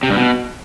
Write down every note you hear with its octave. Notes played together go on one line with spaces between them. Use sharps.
C3
G2
B2